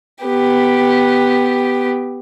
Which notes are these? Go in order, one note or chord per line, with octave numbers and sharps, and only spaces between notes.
B3 G4